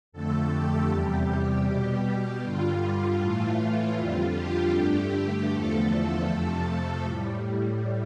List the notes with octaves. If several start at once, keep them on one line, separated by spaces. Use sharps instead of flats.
F2 D3 A3 A4
G4
E2 C3 G3
B2 G3
G2 D3 G3 F4
A2 E3 A3
F2 D3 G3 F4
G4
G2 D3 A3
E2 D3 F3 A3 A4
F2 C3 F3 A3
A2 G3